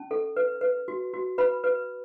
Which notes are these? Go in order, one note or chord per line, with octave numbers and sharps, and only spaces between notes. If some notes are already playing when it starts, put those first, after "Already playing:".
Already playing: C#4 A5
A4
B4
B4
F#4
F#4
B4 B5
B4